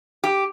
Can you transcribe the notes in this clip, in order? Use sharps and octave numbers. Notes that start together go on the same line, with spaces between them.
G4